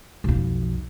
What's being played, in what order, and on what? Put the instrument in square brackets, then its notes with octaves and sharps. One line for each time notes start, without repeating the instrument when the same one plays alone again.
[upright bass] B1 F2